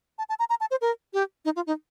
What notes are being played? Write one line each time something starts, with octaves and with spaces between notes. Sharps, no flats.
A5
A5
A#5
A#5
A5
C5
A#4
G4
D#4
F4
D#4